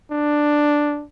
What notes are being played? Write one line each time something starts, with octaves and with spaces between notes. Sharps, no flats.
D4